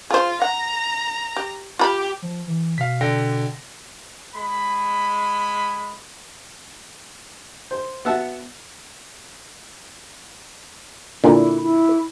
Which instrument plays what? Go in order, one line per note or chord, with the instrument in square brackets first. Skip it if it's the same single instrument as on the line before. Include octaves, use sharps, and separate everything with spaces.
[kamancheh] F4 [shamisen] G#4 C5
[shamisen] F#5 [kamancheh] A#5
[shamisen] G4
[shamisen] F4 B5 [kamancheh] G4
[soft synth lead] F3
E3
[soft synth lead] B2 [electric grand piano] F5 B6
[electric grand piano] D3 G5 A#6
[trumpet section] G#3 B5
[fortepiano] C5
B3 F#4 E5 F#5 A5
[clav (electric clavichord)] A#2 D3 [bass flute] E4
[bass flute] E4